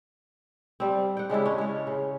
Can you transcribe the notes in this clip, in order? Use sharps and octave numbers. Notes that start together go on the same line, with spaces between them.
G3 C4
F#5 G5
C#3 G#3 D4 E4
C#4
G#3 C#5
C#3